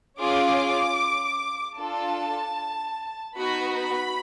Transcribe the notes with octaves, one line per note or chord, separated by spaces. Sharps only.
C#4 F4 G#4 D6
D4 F4 A4 A5
B3 D#4 F#4 B5
B5